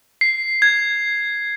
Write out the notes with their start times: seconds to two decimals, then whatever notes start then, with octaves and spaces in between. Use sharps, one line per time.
0.21 C7
0.62 G#6